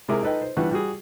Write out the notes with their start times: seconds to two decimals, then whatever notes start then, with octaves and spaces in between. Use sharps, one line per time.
0.09 C3 G#3 E4 G#4 A#4 D6
0.22 D#4 A4 B4 D#5 G5
0.41 C5
0.57 E3 G3 D4 B4 F#5 C#6
0.71 G3 F#4 G#4